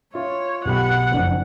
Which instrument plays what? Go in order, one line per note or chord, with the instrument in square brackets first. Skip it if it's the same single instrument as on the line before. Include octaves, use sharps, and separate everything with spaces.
[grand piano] F4 E5 [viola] C#5
[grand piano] B1 G4 B5 [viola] F#5
[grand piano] F#1 F2 D4